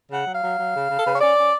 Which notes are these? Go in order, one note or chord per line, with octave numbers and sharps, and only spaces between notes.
C#3
F#5
F#3
F5
F#3
F#3
C#3
C#3
A4
C#3 B4
C#5
C#4 D5
C#4